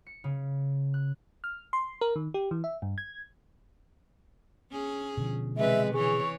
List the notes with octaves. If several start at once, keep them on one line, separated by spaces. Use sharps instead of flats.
C#7
C#3
F#6
F6
C6
A#4
D#3
G4
E3
E5
G2
G#6
C#4 G#4
B2 D3 F3
C3 E3 G#3 B4 E5
E3 G#4 C#5 C#6